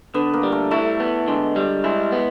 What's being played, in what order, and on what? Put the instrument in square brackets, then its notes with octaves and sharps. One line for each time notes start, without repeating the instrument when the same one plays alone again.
[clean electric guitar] D3 [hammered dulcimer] B3
[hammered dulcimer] A#3
[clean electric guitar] G3
[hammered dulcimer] A3
[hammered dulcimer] A3 [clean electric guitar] E4
[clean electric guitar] B3
[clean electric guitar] D3 [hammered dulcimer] G#3
[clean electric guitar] G3
[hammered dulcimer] G#3 [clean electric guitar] E4
[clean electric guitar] B3